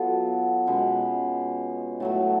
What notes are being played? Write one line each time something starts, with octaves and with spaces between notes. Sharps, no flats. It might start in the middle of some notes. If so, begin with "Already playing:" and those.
Already playing: F#3 B3 F4 A4
B2 G#3 C#4
A2 F#3 A3